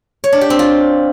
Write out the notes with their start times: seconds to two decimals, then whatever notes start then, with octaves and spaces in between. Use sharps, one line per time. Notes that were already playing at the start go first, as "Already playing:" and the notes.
0.24 C#5
0.33 D4
0.41 G4
0.50 C4
0.59 F4